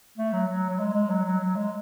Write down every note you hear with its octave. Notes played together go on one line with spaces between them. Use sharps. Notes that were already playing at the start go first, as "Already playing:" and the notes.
A3
F#3
F#3
F#3
G#3
G#3
F#3
F#3
F#3
G#3